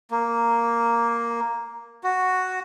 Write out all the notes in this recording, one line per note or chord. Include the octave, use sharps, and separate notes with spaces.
A#3
F#4